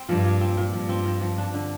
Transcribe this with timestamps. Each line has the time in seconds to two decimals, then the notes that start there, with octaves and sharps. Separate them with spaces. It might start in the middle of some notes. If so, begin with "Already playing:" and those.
Already playing: C4
0.09 G2 F3
0.25 A#2
0.41 C4
0.57 A#2
0.73 G2 F3
0.89 C4
1.05 F3
1.21 F3
1.38 D4
1.54 D3